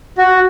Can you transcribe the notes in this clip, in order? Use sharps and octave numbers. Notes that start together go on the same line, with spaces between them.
F#4